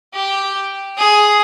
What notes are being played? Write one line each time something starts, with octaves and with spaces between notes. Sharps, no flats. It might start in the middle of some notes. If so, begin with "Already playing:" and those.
G4
G#4